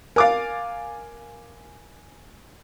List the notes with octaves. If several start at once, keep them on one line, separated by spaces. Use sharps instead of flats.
A#4 F5 G#5 D6 A6